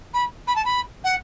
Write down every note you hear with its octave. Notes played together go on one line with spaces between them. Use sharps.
B5
B5
A5
B5
F#5